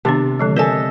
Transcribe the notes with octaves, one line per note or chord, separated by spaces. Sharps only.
C3 D#3 B3 D4
D3 F3 G#3
A4 A#4 D#5 E5 G#5